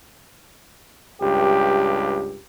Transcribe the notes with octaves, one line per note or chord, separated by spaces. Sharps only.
C#2 G2 G4